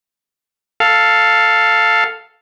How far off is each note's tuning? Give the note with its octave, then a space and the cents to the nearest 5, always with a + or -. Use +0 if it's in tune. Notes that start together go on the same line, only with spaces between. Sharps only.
A4 +5 F5 +0